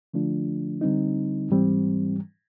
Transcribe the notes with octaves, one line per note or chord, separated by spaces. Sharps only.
D3 F3 A3 D4 F4
D3 G3 C4 D#4
G#2 E3 G3 C4